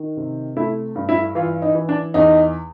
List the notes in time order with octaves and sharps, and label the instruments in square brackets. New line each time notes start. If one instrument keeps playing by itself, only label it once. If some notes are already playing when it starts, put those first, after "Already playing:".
Already playing: [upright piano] D#3
C3
A3 E4
G2
E4
E3 F4
D#4
E3
D4
E2 D#4